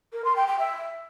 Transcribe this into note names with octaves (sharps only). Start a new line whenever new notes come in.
A#4
C6
G5
G5
E5